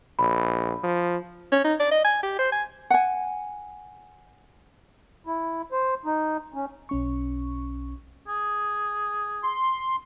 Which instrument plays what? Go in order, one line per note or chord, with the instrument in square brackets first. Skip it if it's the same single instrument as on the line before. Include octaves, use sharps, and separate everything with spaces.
[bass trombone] A#1 [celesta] B5
[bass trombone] F3
[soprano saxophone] C#4
D#4
D5
D#5
G#5
G4
C5
G#5
[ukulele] F#5 G#5
[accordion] E4
C5
D#4
C#4
[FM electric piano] B1 C#4 C#6
[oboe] G#4
[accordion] C6